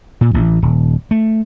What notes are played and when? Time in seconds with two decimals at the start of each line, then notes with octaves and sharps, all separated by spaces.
0.21 A#2
0.34 A1
0.62 D#1
1.11 A3